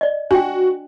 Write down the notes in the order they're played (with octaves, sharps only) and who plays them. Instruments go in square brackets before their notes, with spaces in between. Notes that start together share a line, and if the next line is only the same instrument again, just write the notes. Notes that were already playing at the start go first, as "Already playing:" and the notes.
[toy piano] D5 D#5
[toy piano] D4 G5 [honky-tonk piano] F#4